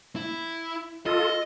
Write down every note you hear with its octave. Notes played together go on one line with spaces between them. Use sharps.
E4
F4 A4 D#5